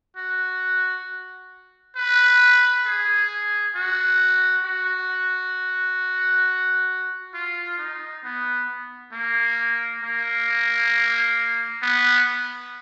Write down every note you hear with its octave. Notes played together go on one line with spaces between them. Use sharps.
F#4
B4
G#4
F#4
F#4
F4
D#4
B3
A#3
A#3
B3